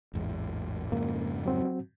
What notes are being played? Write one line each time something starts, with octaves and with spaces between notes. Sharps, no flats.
A1 E2 G#2
F2 G#2 C#3 A#3
F#3 C4 F#4